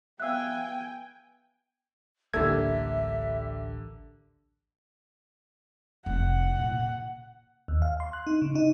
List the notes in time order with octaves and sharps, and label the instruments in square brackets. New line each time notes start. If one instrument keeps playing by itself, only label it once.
[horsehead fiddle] B3 G#5 [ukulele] E5 F5 [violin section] G5 [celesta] E6 F#6
[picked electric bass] A1 D2 [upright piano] D3 G3 A#3 [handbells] A4 G#6 [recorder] E5
[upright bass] F1 [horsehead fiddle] F#5
[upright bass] A#2 C#3
[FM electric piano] D#2
F5
C6
F#6
D#4
C#3
D#4